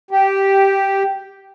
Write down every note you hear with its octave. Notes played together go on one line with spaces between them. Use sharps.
G4